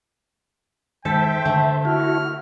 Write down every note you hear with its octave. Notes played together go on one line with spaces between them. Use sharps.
D#3 G#3 A4 C5 E5 G5
D3 A3
E4 F#4 F6